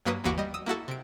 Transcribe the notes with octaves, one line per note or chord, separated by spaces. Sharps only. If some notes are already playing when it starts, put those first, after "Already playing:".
G2 F#3 A#3 F#4 B4 D#6
G1 D#2 E3 A#3 F#4 D6
G3 D#5
D#6 E6
A#3 E4 F#4 A4
C3 D7